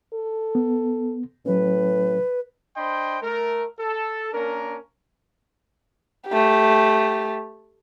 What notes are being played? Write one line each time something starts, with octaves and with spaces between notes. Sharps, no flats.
A4
B3
A2 F#3 C#4 B4
D4 C5 D#5 G5 B5 C6
A3 A#4
A4
A#3 C#4 D4 A#4
A3 G4